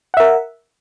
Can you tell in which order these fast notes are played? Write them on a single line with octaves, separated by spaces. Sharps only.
F#5 E5 A#4